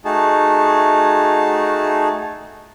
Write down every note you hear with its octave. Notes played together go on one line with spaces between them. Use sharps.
A3 D#4 F#4 G#4 A5